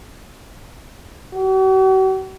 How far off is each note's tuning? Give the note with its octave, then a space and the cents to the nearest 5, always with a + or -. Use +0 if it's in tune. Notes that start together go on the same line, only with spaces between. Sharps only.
F#4 +45